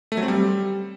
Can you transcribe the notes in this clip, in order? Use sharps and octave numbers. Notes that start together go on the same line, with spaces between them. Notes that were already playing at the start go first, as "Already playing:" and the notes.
A3
F#3
C4
G3